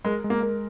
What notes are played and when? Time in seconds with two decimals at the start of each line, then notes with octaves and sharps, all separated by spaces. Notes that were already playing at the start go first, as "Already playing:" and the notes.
0.05 G#3 A#4
0.24 G#3
0.30 A#3
0.43 A#4